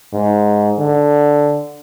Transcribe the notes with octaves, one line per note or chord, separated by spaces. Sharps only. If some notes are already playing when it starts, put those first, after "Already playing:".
G#2
D3